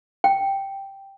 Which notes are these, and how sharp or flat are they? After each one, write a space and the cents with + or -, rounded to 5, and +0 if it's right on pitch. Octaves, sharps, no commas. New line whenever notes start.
G5 +0